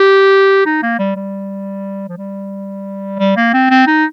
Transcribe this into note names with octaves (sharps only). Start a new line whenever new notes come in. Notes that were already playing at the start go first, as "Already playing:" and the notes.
Already playing: G4
D#4
A#3
G3
G3
F3
G3
G3
A#3
C4
C4
D#4